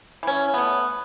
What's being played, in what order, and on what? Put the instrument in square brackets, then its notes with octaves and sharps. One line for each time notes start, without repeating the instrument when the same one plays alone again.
[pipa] E3 C#4
A3 B3